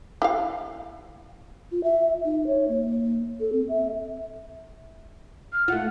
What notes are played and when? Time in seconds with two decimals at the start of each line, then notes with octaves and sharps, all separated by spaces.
0.22 E4 G4 F5
1.71 F4
1.84 E5
2.25 D#4
2.47 C#5
2.69 A#3
3.40 A4
3.53 C4
3.69 E5
5.53 F6
5.68 A3 F4 F#5